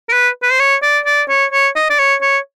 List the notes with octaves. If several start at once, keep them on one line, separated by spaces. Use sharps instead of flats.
A#4
B4
B4
C5
C#5
D5
D5
C#5
C#5
D#5
D5
C#5
C#5